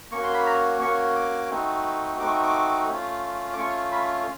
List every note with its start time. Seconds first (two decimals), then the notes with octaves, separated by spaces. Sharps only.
0.12 A#3 C#4 F#4 C#6
0.23 C6
0.34 B5
0.46 A#5
0.81 A#3 C#4 F#4 C#6
1.15 D6
1.50 A3 C4 D#4 F#4
2.19 A3 C4 D#4 F#4 D6
2.43 D6
2.89 A3 C#4 F4
3.53 D6
3.57 A3 C#4 F4 C#6
3.92 B5